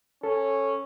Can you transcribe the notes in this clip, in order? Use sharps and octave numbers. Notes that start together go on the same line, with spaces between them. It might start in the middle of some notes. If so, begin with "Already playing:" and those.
C#4 A4